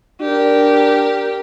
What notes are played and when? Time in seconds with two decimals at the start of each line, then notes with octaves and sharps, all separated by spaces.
0.21 D4 G4 A#4